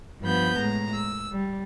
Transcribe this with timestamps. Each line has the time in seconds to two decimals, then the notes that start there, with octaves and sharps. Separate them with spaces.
0.21 G2 F3 B3 B5 G6
0.57 A2 G#3 A#5
0.94 E6
1.31 G3